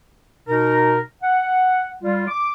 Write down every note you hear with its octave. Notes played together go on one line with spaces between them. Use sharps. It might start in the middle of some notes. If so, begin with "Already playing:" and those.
B2 D#4 A#4
F#5
G3 F4
D6